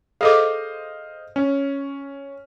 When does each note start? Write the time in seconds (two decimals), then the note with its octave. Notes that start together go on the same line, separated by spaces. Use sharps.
0.21 G#4 A4 C5 D#5 F5 D6
1.36 C#4